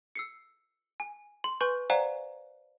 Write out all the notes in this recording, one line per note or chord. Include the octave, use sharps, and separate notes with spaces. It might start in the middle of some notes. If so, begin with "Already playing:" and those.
E6 C7 C#7
G#5
C6
B4 G#5 C6 C#6 G6
C5 D5 F5 F#5 G#5 A#5